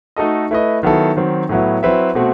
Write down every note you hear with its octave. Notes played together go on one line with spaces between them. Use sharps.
A3 D#4 F#4 A4 D#5
A3 E4 B4 D#5
D#3 F#3 B3 E4 A4
D#3 F#3 C4
A2 F#3 B3 E4
F#3 C4 E4 B4 E5
B2 A3 C4 F#4